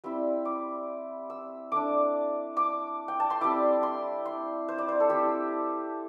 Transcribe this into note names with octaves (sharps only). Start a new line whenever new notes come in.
G3 C4 E4
D6
E6
A3 D4 D6
D6
G5
A5
C6
G3 C4 E4 D6
C6
C6
C5
D5
C5
A4
A3 C4 E4 G4